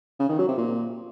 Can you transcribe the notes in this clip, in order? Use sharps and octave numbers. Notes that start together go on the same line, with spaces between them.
C#3
D#3
F#3
C3
A#2